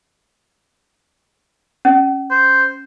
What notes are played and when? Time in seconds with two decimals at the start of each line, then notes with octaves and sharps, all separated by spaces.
1.85 C#4
2.31 C5